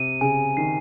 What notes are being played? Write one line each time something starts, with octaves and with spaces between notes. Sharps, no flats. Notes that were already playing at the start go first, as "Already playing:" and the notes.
Already playing: C3 D#7
C#3 G#5
D#3 C7